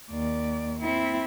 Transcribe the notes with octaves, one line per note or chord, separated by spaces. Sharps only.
D#2 D5
C4 E4